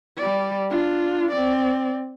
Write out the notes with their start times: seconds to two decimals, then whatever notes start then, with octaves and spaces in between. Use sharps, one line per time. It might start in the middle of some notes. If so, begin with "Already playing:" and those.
0.18 G3 D5
0.70 D4 F4
1.32 C4 D5